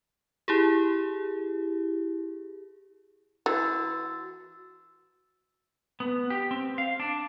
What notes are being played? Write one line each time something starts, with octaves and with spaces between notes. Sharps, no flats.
E4 G4 G#4
E3 F#4 E6 A6
B3
G4
C4
F5
D4